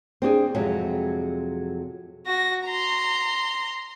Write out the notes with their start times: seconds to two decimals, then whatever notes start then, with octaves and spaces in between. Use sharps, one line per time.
0.22 C4 D4 G4 G#4
0.54 F2 C3 F#3 G#3
2.26 F#4 A#6
2.65 A#5 C6